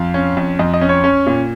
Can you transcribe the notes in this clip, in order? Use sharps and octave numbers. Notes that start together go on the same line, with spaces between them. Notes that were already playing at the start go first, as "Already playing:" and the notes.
Already playing: F2 F5
C#4
F2
F2 D#5
D#5
C#4
C#5
C#4
A#2